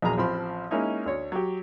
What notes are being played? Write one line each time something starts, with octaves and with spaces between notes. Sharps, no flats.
A#1 E2 F#3 G#4 A#5
A1 F3 C4 B5 C6
G#3 A#3 C#4 D#4 E4
D2 C#5
F#3 G4